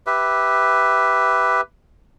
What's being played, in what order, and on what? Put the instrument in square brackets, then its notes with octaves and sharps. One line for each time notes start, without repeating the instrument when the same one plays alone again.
[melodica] G4 B4 E5